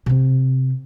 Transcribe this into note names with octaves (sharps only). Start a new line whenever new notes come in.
C3 C4